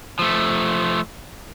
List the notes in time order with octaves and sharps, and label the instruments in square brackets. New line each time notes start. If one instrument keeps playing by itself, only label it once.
[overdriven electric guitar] F3 A3